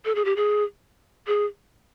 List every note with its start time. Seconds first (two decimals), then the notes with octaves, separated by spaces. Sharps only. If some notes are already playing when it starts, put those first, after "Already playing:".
0.05 A4
0.15 G#4
0.25 G4
0.36 G#4
1.27 G#4